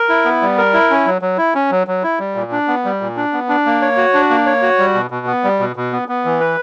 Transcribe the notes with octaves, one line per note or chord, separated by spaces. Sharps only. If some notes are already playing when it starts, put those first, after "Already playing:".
Already playing: A#4
E4
B3
G3
A#4
E4
C#4
F#3
F#3
E4
C#4
F#3
F#3
E4
G3
A#2
D4
B3
G3
A#2
D4
B3
D4
A#3
C#5
F#4
D4
A#3
C#5
F#4
G3
B2
B2
B3
G3
B2
B2
B3
B3
E3
B4